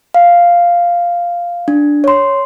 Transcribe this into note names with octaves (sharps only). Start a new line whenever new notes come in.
F5
D4
C#5 C6